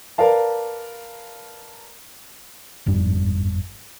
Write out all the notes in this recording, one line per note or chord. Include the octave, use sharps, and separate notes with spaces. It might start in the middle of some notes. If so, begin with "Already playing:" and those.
A#4 B4 D5 F5 A5
G1 F2 G#2 G3